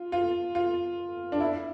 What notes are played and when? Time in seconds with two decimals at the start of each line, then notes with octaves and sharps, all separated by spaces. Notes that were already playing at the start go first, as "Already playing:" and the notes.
Already playing: F4
0.12 F4
0.55 F4
1.32 D4
1.40 E4